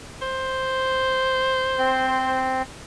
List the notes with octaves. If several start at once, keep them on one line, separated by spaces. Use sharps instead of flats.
C5
C4